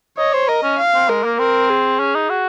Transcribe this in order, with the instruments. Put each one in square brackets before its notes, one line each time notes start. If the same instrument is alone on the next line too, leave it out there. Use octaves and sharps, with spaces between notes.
[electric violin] C#5 [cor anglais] D#5
[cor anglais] C5
[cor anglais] A#4 [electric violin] D#5
[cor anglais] C#4
[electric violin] F5
[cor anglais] C4
[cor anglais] G#3 [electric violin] A#4
[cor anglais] A#3
[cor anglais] C4 [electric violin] A#4
[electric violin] G#4
[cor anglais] C#4
D#4
F#4